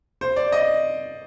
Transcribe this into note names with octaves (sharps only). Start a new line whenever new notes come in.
C5
D5
D#5